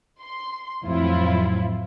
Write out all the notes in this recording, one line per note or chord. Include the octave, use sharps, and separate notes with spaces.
C6
F2 A2 F3 F#3 E4 F4